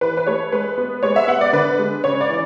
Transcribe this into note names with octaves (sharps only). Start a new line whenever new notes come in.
E3 B4
B4
A3 C#5
G#3 B4
B3
G#3 C#5
E5
B3 F#5
D5
D3 B4
G#3
C#3 C#5
D5
E3